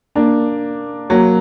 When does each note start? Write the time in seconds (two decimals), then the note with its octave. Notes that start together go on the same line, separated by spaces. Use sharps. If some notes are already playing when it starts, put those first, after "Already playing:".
0.15 A#3 D4
1.10 F#3 A#3